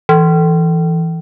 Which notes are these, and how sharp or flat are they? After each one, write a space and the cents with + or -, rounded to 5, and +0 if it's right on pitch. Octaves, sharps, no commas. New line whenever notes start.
E3 -5